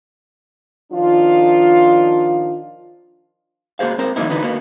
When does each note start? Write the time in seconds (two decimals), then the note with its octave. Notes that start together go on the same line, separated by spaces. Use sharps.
0.92 D#3 F3 D4 F4
3.79 A#3 F#4 G#4 C5 F5
3.98 C4 A#4 C5
4.16 E3 F#3 G#3 A#3 D#4 E4
4.30 D3 E3 D#4 F#4 B4
4.44 A#3 B3 F#4